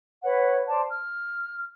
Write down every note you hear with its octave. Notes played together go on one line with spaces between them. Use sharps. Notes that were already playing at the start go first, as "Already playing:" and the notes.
B4 C#5 F#5
C5 D5 A5
F6